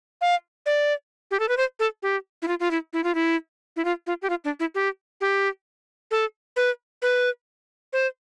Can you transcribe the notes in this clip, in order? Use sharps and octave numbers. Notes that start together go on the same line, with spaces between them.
F5
D5
G4
A4
B4
C5
A4
G4
E4
F4
F4
E4
E4
F4
E4
E4
F4
F4
G4
F4
D4
E4
G4
G4
A4
B4
B4
C5